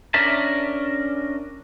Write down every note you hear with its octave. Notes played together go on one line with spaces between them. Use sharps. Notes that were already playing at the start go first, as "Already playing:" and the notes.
C#4 D4 A#4 E5 A5